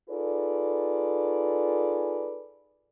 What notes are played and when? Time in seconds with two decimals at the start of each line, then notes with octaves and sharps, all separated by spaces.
0.10 D#4 F4 G#4 A4 B4 D5